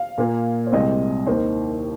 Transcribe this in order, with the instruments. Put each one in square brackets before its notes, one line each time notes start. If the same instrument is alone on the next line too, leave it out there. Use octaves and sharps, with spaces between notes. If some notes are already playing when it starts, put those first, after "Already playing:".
Already playing: [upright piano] F5
A#2 A#3
C5
C2 C3 G#3 C4 D#5
D#2 D#3 A#3 C5